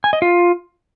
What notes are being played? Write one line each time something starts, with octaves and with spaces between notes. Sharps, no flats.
G#5
D#5
F4